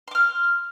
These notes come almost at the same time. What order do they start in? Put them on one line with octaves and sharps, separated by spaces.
C6 D6 F6